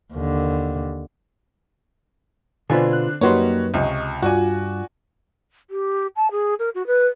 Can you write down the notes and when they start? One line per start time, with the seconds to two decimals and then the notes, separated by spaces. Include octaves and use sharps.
0.14 D#2 D3
2.70 B2 D3 C4 D4 F4 B4 G#5
2.93 F#6
3.21 F#2 G3 A#3 D#4 F#4 B4 C#5 C6
3.74 C#2 C3 D#5 C#6
4.23 G2 F4 F#4 D5 G#5
5.70 G4
6.16 A5
6.31 G#4
6.59 A#4
6.74 F#4
6.86 B4